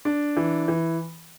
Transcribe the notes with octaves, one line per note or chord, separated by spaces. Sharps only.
D4
E3
E3